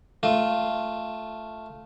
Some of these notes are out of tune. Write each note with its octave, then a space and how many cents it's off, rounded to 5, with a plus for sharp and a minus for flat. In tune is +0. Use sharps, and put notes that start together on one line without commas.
A3 +0 F4 +0